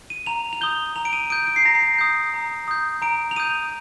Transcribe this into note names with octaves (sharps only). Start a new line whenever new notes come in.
D#7
A#5 F7
F7
D#6 G6 G7
A#5 F7
D7
D#7
D#6 G6 D7
D7
C7
A#5 A#6
C7
D#6 G6
A#5
D#6 G6
A#5 D7
F7
D#6 G6 D#7